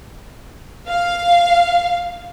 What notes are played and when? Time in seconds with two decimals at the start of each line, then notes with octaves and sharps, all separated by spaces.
0.88 F5